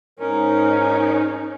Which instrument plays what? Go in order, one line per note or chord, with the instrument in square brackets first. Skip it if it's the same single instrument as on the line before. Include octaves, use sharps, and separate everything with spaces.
[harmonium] G#2 A#4 [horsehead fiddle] C#4 D#4